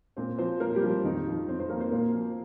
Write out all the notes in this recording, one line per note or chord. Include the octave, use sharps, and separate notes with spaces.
A#2 C4
F3 C4 C5
A#2 A#3 A#4
G3 G4
F3
C4
F2 D#3 D#4
F3
F2 C4
C4 C5
F3 A#3 A#4
C4 C5
A#2 A#3 A#4
F3